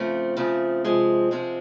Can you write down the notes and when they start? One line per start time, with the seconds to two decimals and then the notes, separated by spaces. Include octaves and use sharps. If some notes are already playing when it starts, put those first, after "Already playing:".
Already playing: C#3 F3 A3 C4
0.37 C#3 F3 A3 C4
0.85 C3 F3 G#3 C4
1.31 C3 F3 G#3 C4